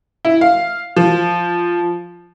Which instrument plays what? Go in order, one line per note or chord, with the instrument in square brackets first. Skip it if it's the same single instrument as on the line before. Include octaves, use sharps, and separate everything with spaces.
[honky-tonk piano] E4
F5
F3